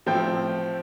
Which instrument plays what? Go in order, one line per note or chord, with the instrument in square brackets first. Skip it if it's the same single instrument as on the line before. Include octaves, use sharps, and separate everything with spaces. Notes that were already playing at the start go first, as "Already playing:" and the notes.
[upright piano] A2 F3 C4 C5 E5 G5